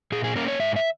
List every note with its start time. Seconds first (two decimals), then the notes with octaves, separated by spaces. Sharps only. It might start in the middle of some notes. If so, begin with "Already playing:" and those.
0.12 A#2 G#4
0.24 G#4
0.36 A#3 C#4 A#4
0.48 C#5
0.60 G#2 E5
0.76 E5